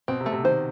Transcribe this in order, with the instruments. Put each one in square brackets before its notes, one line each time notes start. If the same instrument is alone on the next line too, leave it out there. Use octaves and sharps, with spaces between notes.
[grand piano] B2 [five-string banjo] C4
[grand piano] C3
[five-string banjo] A3
[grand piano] C3
[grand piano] D#3 [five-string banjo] C5